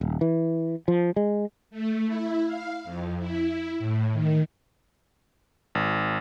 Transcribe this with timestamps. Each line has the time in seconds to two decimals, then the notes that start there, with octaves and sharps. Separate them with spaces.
0.01 D#1
0.21 E3
0.88 F3
1.16 G#3
1.71 A3
2.06 E4
2.46 F5
2.84 F2
3.19 E4
3.78 A2
4.12 D#3
5.75 G#1